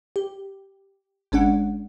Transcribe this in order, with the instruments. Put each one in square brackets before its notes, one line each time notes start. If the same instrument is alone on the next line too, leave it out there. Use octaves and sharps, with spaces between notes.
[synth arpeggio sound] G4
G#1 G#3 C#4 D4 F#5